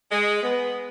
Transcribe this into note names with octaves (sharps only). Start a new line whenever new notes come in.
G#3
B3